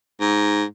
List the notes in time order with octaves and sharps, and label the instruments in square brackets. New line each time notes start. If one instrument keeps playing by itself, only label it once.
[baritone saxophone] G#2